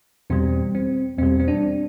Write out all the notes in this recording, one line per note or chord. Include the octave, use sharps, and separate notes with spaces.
E2 B2 G3 C4
C4
E2 B2 G3 C4
C4
D4